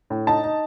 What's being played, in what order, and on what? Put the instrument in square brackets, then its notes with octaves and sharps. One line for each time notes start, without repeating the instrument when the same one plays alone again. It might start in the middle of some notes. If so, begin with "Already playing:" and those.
[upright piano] A2
D#4 A5
D#4